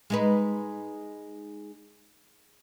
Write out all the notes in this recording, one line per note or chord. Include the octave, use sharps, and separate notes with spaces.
G#3 D#4 B4